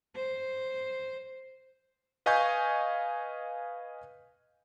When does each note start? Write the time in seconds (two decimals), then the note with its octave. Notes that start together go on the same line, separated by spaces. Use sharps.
0.15 C5
2.26 B4 D#5 F5 G#5 C#6 G6